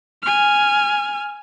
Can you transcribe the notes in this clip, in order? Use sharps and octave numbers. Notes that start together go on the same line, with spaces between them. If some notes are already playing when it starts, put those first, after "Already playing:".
G#5 F6